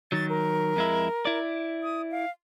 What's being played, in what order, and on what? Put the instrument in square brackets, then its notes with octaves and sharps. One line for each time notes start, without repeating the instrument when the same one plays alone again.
[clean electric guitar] D#3 F#3 [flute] A6
[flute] A#4
[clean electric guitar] F2 G#3 E4
E4 D5
[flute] D#6
F5